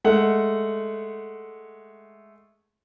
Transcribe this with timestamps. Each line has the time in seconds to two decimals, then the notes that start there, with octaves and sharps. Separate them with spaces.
0.04 G#3 A3 F#5